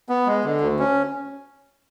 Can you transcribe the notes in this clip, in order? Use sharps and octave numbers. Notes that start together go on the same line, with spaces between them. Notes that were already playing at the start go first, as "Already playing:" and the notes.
B3
G#3
D3
D2
C#4